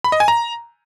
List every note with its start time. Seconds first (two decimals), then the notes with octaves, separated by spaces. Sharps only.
0.04 B5
0.12 D#5
0.20 G#5
0.28 A#5